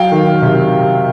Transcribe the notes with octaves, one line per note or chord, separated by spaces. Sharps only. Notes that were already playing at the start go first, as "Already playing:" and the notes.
Already playing: F#3 F5 G5
D#3
C3